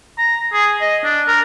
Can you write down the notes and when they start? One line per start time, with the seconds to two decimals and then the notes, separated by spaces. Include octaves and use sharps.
0.18 A#5
0.53 G#4
0.81 D#5
1.04 D4
1.28 A#4